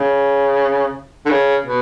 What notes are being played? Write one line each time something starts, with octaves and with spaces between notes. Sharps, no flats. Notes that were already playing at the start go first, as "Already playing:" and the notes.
Already playing: C#3
D3
C#3
B2